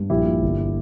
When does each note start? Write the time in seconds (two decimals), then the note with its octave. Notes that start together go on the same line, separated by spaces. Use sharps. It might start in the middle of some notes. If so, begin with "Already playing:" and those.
Already playing: G2
0.10 A#1 E4 G4
0.26 A#2
0.42 G1